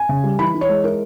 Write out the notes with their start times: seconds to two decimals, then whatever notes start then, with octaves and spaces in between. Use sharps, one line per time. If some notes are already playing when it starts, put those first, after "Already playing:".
Already playing: G#5
0.09 C#3
0.24 G3
0.39 E3 B5
0.54 E3
0.61 C#5
0.69 G#3
0.84 E4 A#4